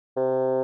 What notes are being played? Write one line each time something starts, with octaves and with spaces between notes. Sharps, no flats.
C3